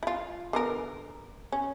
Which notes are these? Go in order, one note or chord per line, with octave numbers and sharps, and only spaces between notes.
E4 F4
D3 B3 A#4
C#4